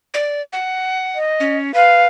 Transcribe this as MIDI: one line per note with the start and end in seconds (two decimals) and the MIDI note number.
0.14 0.42 74
0.53 1.18 78
1.15 1.57 75
1.40 1.72 61
1.74 2.07 71
1.74 2.07 77